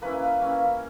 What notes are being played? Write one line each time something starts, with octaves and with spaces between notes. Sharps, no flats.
A#3 C#4 E4 B4
A#3 C#4 E4